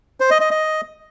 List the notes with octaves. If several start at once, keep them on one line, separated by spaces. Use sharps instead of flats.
C5
D#5
D#5
D#5